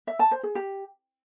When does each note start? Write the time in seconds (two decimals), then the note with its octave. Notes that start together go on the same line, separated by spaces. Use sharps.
0.07 E5
0.19 A5
0.31 C5
0.43 G#4
0.55 G4